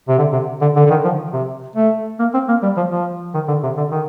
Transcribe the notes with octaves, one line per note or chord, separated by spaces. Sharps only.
C3
D3
C3
D3
D3
D3
D#3
F3
C3
A3
A#3
C4
A#3
G3
F3
F3
D#3
D3
C3
D3
D#3